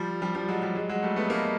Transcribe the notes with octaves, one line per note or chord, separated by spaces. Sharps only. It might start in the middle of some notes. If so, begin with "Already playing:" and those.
Already playing: F3 G3
F3 G3
F3 G3
F#3 G#3
F3 G3
F#3 G#3
F#3 G#3
G3 A3
A3 B3
G#3 A#3